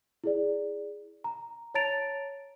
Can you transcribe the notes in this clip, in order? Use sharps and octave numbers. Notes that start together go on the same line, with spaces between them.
E4 G#4 D5
A#5
C#5 A5 A#5 A6 D7 F7